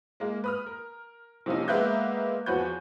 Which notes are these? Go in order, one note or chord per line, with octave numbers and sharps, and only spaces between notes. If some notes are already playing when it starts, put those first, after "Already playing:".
G#3 A#3
B4 D#6 F6
A#4
C3 F3 A#3 C#4 D#4
G#3 A#3 B3 E5 F#6 G6
E2 F3 F#4 B4 C#5 G6